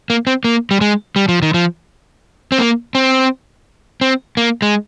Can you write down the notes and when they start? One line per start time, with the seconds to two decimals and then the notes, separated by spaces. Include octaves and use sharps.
0.10 A#3
0.27 C4
0.44 A#3
0.71 G3
0.81 G#3
1.16 G3
1.29 F3
1.42 D#3
1.54 F3
2.52 C4
2.58 A#3
2.95 C4
4.01 C4
4.37 A#3
4.62 G#3